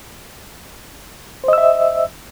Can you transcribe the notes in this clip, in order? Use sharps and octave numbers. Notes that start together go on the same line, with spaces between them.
C5 D#5 E5 E6